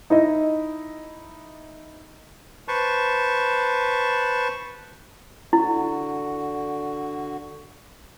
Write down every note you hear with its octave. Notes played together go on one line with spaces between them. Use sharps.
D#4 E4 D#5
B4 C5 A5 C#6
D3 E4 F#4